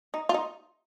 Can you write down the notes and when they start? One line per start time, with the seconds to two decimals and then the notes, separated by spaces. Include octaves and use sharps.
0.14 D#4
0.29 F4
0.34 D#4